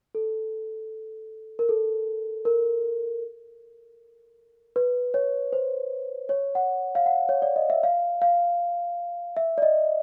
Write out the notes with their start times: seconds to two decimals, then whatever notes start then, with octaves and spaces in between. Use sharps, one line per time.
0.15 A4
1.59 A#4
1.69 A4
2.45 A#4
4.76 B4
5.14 C#5
5.53 C5
6.29 C#5
6.55 F#5
6.95 F5
7.06 F#5
7.29 C#5
7.42 D5
7.56 D#5
7.70 E5
7.83 F5
8.22 F5
9.37 E5
9.58 D5
9.62 D#5